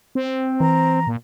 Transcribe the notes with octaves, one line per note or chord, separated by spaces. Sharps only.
C4
E3 A#5
A#2